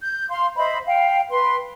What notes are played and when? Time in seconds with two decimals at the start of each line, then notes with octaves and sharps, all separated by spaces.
0.01 G6
0.29 F5 C6
0.56 C5 D#5 E5 B5
0.86 F5 G5
1.29 B4 C6